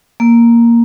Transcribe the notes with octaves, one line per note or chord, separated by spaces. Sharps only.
A#3